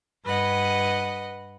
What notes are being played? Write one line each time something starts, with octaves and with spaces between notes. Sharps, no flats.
G2 B4 D#5 F#5